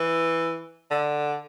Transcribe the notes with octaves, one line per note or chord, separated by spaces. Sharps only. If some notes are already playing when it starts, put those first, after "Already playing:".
Already playing: E3
D3